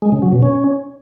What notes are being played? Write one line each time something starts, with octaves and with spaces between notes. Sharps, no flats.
G#3
C#3
F#3
B2
C#4